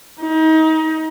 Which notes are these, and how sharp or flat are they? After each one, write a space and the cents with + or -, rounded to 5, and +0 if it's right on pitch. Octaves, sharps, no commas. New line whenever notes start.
D#4 +30